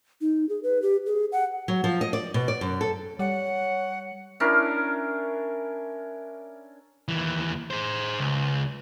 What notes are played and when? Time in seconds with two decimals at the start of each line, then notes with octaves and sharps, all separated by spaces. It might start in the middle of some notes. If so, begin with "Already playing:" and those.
0.21 D#4
0.49 G#4
0.63 B4
0.82 G4
1.06 G#4
1.32 F#5
1.68 F#3
1.84 F3
2.01 D#5
2.13 D5
2.34 B2
2.48 D5
2.61 F#2
2.81 A4
3.19 G3 C#5 F#5
4.40 C#4 D4 E4 A#4
7.08 D#2 E3
7.71 G#4 C5
8.19 C#2